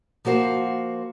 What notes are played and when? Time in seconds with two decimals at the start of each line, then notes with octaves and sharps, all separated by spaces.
0.25 F3 A#3 F#4 C5